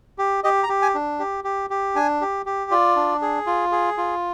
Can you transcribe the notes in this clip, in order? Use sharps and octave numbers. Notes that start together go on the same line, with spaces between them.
G4
G4 D#5
A#5
G4
G#5
D4
G4
G4
G4
D4 G#5
G4
G4
F4 D5
D4
G#4
F4
G#4
F4